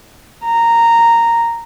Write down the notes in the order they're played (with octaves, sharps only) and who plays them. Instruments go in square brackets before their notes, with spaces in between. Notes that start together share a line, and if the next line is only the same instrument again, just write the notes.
[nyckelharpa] A#5